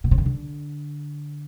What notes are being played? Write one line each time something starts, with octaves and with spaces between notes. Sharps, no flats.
B2
C3
C#3
D3